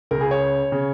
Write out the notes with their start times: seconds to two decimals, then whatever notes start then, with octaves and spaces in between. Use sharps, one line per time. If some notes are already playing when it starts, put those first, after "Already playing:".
0.11 C#2 C#3 A#4
0.21 G#4
0.31 C#5
0.72 C#3